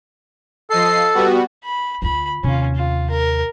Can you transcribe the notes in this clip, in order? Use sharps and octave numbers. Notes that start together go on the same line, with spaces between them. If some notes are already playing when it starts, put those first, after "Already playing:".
F3 A4 D#5 C7
G3 B3 F#4
B5
D2 F4 B5
D#2 C3 C#4 F4
F4
A#4